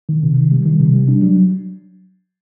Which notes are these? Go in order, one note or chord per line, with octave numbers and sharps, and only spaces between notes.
D#3
C3
D#3
G3
D#3
C3
G3
D4
F#3